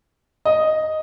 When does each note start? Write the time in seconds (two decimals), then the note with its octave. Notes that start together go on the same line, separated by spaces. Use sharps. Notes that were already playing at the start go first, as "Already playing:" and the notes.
0.45 D#5